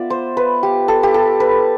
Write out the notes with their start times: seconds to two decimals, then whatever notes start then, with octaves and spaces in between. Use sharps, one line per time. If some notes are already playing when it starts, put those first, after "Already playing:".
Already playing: B3 F4 D5 E5
0.10 C5
0.37 B4
0.63 G4
0.88 A4
1.03 G4
1.14 A4
1.40 B4